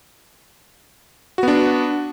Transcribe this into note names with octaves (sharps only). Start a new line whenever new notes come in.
B3 D4 F#4